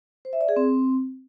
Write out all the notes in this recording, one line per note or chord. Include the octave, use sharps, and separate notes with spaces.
C5
E5
D5
G#4
C4